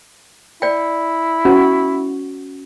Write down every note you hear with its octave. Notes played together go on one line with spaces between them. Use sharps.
E4 D5 G5
C#4 F#4